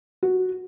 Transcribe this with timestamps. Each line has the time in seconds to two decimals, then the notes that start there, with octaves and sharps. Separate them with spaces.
0.23 F#4